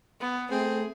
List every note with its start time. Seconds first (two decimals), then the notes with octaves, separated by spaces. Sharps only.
0.21 B3
0.51 A3 C4 G#4